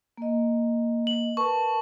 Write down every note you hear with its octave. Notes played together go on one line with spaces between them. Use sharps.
A#3 D#5
F#7
A#4 B4 A5 C#6